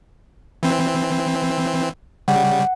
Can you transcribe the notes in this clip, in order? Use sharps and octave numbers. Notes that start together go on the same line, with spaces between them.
E3 C4
C#3 G3 F#5